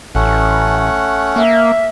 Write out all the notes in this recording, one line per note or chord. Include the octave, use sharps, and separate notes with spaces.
A1 A3 C#4 F#5
A#3 E5